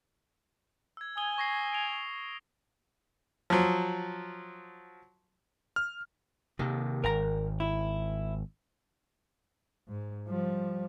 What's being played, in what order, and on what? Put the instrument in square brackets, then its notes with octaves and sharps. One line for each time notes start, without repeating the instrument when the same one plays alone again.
[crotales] E6 G#6
[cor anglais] G#5 [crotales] D#6 G7
[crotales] C#6 A#6 C7
D7 F7 G7
[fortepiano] F3 F#3
[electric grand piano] F6
[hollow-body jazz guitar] D#2 [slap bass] C3 D#3
[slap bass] G#1 [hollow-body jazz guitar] A#4 A#5
[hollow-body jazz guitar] E4
[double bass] G#2
F3 G3